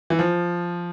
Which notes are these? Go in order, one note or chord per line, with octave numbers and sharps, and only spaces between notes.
E3
F3